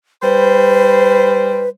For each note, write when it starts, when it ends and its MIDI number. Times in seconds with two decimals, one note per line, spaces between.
0.23 1.67 55
0.23 1.69 71
0.23 1.67 72